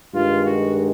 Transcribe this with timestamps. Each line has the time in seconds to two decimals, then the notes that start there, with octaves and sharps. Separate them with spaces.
0.14 G2 D#3 G#3 F4
0.45 F#4